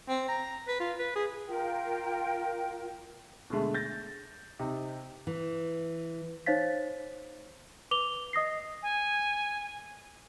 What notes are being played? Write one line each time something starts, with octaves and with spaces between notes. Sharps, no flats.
C4
A#5
B4
F4
B4
G#4
F4 A#4 G5
B2 D3 G#3 A3
G6 A6 A#6
C3 D#4
E3
D#4 C5 C#5 F5 A6 B6
B4 D6 F7 G7
D#5 D#6 A#6 C7
G#5